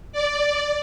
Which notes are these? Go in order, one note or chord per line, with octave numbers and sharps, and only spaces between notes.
D5